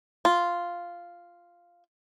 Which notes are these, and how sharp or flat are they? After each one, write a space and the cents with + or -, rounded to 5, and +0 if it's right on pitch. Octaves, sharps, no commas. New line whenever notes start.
F4 -5